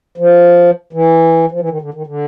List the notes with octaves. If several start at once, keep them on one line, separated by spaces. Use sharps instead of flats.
F3
E3
F3
E3
D#3
D3
D#3
D3